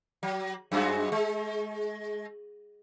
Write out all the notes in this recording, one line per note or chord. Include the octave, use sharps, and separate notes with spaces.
F#3
F#2 G#3 F#4
G#3